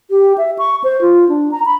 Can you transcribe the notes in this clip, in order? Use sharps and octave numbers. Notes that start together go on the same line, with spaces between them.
G4
E5
C#6
C5
F4
D4
A#5
B5